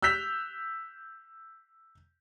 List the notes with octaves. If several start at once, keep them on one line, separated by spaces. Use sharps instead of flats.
E6 F#6 G6 B6 F7